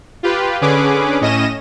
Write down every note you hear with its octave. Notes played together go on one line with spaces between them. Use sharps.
F4 G4 B4
D3 C#4 G#4 B4 D6
A2 C#4 D#5 A#6 D#7 E7